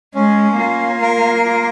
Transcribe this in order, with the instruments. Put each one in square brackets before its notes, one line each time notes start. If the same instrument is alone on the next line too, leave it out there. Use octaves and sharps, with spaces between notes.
[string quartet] G#3 [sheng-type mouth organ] C#4
[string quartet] A#3 [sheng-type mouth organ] F4
[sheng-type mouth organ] A#4
F4